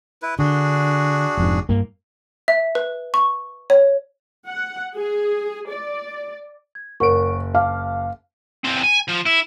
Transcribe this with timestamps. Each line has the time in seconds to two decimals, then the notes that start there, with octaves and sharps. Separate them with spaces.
0.22 E4 B4
0.39 D3 D4 F#4 G#4
1.37 F1 F2 G#2
1.69 G2 A#3
2.48 E5
2.75 B4
3.14 C#6
3.70 C#5
4.46 F#5
4.97 G#4
5.71 D5
6.75 G#6
7.00 F#1 A#4 C#5 F#5 C#6 D7
7.55 F5 A5 D6 F6
8.65 E2 C4
8.84 G#5
9.09 F3
9.26 E4